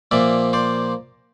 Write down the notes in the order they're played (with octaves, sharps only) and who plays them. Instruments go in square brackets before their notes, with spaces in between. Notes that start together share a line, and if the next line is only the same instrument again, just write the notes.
[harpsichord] A#2 F3 A#3 D5 E5
C5 D5